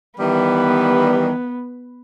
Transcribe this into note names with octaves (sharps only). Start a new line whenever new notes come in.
D#3 E3 G3 B3